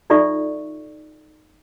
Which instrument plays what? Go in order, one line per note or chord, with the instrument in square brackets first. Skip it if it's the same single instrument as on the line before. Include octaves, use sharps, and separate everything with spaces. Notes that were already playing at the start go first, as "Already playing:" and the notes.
[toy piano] D#4 F4 A4 D5 E5 C#6